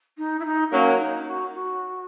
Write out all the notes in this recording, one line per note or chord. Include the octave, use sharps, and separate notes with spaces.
D#4
E4
D#4
F#3 A#3 C#4
D#4
F#4
F#4